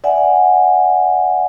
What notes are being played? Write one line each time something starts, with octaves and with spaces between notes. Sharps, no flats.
D5 E5 F#5 G#5